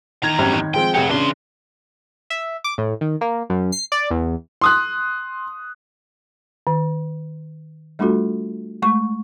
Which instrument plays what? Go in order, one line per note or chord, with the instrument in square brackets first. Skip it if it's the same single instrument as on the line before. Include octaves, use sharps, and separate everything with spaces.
[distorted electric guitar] E2 A#5 [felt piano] D#3 G#6
[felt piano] G#1 F#2 G3
D#3
[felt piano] F3 G#3 C4 [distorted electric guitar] G5
[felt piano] F1 G#4 G5 [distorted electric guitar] F#3 F#5
[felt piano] C#3 D4 [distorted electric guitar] E3 C6
[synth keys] E5
D6
A2
D#3
A#3
F#2
C7
D5
E2
[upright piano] C6 D#6 F#6
[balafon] D#3
G3 A3 D4 F4 F#4 A4
G#3 A3 C#6